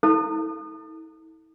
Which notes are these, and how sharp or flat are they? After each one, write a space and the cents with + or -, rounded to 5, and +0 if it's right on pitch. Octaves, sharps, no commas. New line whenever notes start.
E4 -45 A4 +10 A5 +45